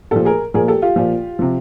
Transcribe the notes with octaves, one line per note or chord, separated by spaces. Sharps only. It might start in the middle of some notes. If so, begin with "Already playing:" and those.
A#2 F3 G4 A4
G#4 A#4
A#2 F3 G#4 A#4
G4 A4
F4 G4
A#2 F3
C3 F3